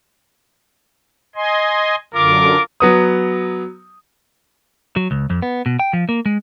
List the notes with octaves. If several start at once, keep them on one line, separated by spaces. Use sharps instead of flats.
D#5 G#5 C6
F#2 D3 F4 A#4 D6
F#3 B3 D#6
F#3
C#2
F2
B3
B2
G5
F3
A#3
G#3